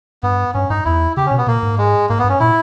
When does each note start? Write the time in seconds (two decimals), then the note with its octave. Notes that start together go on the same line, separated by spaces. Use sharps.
0.23 G2 B3
0.54 G2 C#4
0.70 G2 D#4
0.85 E2 E4
1.17 C#3 G4
1.26 C#4
1.31 B2
1.38 B3
1.47 A#2 A#3
1.63 G#2
1.78 G#3
2.09 G#2 A#3
2.19 B3
2.24 G2
2.29 C#4
2.40 A#2 E4